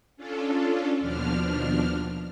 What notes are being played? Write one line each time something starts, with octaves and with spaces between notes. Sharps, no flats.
C#4 D4 F4 A4
D#2 B2 F3 D4 F6